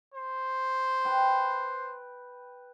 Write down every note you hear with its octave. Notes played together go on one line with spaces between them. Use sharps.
C5
B4 G5